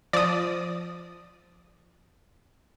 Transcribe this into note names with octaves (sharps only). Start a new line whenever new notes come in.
F3 D5 D#6